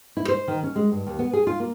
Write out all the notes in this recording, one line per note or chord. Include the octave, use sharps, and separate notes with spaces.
E4
C5
D#3
C#4
G#3
G2
D#2
B3
G#4
F4
A#3